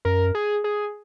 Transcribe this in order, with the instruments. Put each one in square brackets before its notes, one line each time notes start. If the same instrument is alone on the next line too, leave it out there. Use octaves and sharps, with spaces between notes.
[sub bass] F#2 [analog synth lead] A#4
[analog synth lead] G#4
G#4